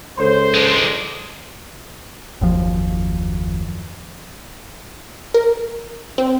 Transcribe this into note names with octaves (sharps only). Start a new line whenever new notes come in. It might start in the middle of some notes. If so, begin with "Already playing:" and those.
C#2 A4 C5 C#5 C6
G#3 D4
F#1 D#2 F3
A#4
C4